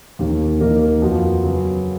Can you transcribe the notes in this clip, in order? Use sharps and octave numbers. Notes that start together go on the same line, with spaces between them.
D#2 D#3 A#3
D#2 D#3 A#3 D#4 A#4
F2 F3 B3 F#4
C#3 F#3 B3